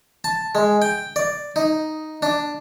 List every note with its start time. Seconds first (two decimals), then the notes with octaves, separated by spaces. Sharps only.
0.24 A5
0.55 G#3
0.82 G5
1.16 D5
1.56 D#4
2.22 D4